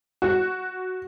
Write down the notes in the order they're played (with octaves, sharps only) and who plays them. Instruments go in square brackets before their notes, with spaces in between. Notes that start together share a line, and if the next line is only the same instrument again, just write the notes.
[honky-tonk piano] F#4